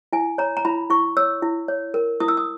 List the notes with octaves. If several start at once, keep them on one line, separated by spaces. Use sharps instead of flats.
E4 G#5
C#5 A#5
A#5
E4 B5
E4 C#6
C#5 E6
E4
C#5
A#4
E4 D#6
E6
D#6